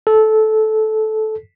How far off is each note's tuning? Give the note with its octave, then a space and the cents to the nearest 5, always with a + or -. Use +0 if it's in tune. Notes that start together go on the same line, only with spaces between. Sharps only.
A4 -15